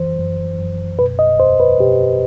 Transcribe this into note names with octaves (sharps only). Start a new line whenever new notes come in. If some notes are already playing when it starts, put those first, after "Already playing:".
Already playing: F#2 E3 C5
F#2
F#2
B2 B4
D#5
E2 C5
B4
B2 G4